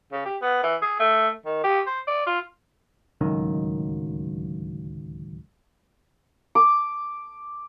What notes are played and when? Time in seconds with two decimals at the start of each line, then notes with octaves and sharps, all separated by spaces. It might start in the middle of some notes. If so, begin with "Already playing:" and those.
0.12 C#3
0.26 G4
0.42 B3
0.63 E3
0.82 G#4
1.00 A3
1.45 D#3
1.64 G4
1.86 C5
2.07 D5
2.26 F4
3.21 D1 C#2 F#2 D#3
6.55 D6